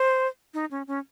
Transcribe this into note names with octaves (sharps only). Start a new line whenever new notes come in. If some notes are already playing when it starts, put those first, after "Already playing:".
Already playing: C5
D#4
C#4
C#4